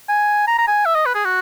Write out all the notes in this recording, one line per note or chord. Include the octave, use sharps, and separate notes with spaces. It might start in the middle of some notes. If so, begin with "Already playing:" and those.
G#5
A#5
A#5
G#5
E5
D#5
B4
G#4
F#4